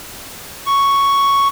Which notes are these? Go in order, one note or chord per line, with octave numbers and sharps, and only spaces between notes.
C#6